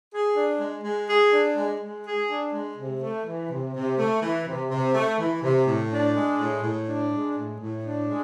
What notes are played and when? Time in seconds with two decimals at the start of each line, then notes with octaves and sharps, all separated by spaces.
0.11 G#4
0.35 D4
0.60 G#3
0.84 G#3
1.08 G#4
1.32 D4
1.56 G#3
1.80 G#3
2.05 G#4
2.29 D4
2.53 G#3
2.77 C3
3.01 A3
3.25 E3
3.50 C3
3.74 C3
3.98 A3
4.22 E3
4.46 C3
4.70 C3
4.95 A3
5.19 E3
5.43 C3
5.67 A2
5.91 D4
6.15 G#3
6.39 A2
6.63 A2
6.87 D4
7.12 G#3
7.36 A2
7.60 A2
7.84 D4
8.08 G#3